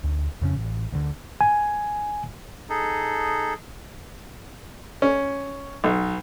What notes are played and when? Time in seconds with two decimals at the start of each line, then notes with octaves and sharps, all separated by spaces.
0.03 D2
0.41 F2 C#3 C#4
0.56 A1
0.92 D2 D3
1.41 G#5
2.70 D#4 G#4 A4
5.02 C#4
5.84 B1